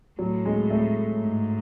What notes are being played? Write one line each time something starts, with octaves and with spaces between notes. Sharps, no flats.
A2 F#3
G#3
A3
G#2